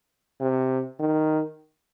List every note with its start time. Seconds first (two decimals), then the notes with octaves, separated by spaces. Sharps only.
0.40 C3
0.99 D#3